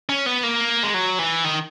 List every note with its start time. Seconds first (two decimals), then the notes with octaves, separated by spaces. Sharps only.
0.09 C#4
0.26 B3
0.43 A#3
0.83 G#3
0.94 F#3
1.19 E3
1.45 D#3